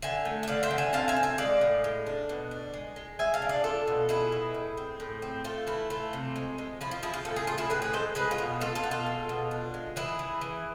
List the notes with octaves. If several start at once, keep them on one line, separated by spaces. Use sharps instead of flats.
D3 E5 G#5
A3
E5
D3 D5 F5
C5 E5
D3
E5 G#5
C4 F5 A5
E5 G#5
C4
E5 G#5
G#3 D5 F5
A2
G#3
D4
B2
D4
G#3
G#3
G#3 E5 G#5
F5 A5
D4
D5 F5
D4 F4 A4
B2
B2 E4 G#4
B2
A2
C4
A2
C4
A3 F4
E3 E4
A3 F4
C3
G#3
G#3
F3 E4
F4
F3 E4 G#4
F4
A2 A4
G#4
A2 F4
E4 G#4
A2 G#4 B4
G#4 B4
G#3 A4 C5
G#3 G#4 B4
F4
B2
G#3 F4 A4
F4 A4
B2
F4 A4
G#3
B2
D4
G#3
E3 E4 G#4
E3
E3